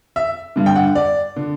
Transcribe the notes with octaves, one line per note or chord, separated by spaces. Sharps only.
E5
G2 D3
G5
F#5
D5
D3